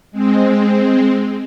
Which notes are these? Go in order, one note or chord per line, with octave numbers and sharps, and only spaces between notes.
G#3 C4